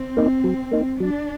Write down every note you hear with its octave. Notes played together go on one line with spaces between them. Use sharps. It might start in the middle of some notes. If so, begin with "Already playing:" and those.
Already playing: C4
A#3 D#4
F#3
A#3 D#4
F#3 D4